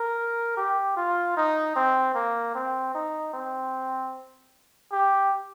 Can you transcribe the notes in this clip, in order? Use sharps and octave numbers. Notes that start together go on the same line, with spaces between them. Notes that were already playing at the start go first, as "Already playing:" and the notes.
Already playing: A#4
G4
F4
D#4
C4
A#3
C4
D#4
C4
G4